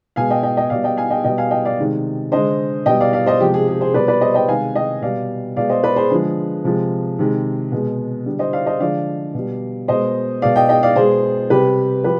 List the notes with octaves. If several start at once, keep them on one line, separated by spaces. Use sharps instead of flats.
B2 G#3 F5 G#5
D#5 G5
D#5 G5
D#5 G5
B2 G3 D5 F5
D#5 G5
F5 G#5
D#5 G5
B2 G3 D#5 G5
F5 G#5
D#5 G5
D5 F5
C3 D#3 G#3
D3 G#3 C5 D#5
B2 G3 D#5 G5
D5 F5
D5 F5
C5 D#5
C3 F3 G#3 G4
G#4
G#4
G#4 C5
B2 G3 B4 D5
B4 D5
C5 D#5
D#5 G5
C3 D#3 G#3 F5 G#5
D#5 G5
B2 G3 D5 F5
B2 G#3 D5 F5
C5 D#5
B4 D5
G#4 C5
D3 F3 G#3 G#4
C3 F3 G#3
C3 D#3 G#3
B2 G#3
D3 G3
C5 D#5
D5 F5
C5 D#5
D3 F3 G#3 D5 F5
B2
G3
B2 G#3 C5 D#5
B2 G#3 D5 F5
D#5 G5
D#5 G5
D5 F5
B2 G#3 G#4 C5
C3 G3 G4 B4
F3 G4 B4